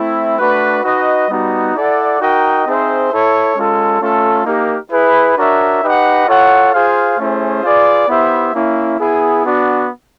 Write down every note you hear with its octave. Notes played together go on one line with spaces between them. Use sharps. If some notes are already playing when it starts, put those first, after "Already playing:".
Already playing: A3 C4 E4
A3 D4 F#4 B4
D#4 F#4 B4 D#5
G3 B3 D#4 F#4
E4 A4 D5 F#5
D#4 F#4 A#4 D#5 G5
C4 D#4 G#4 C5 E5
E4 A4 C#5
G#3 C#4 F4 A4
A3 C#4 F4 A4
A#3 D#4 G4 A#4
E4 G#4 B4
D4 F#4 A#4 C#5 E5
D#4 G4 B4 D#5 F#5
F4 A4 C#5 F#5
F4 G#4 C5 F5
A3 C#4 E4 G#4 C5
F4 G#4 B4 D5
B3 E4 G4 C5 E5
A#3 C#4 E4
B3 E4 G#4
B3 D4 F#4